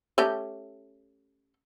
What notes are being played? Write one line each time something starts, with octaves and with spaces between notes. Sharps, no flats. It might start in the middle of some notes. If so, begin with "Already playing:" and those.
A3 C#4 G4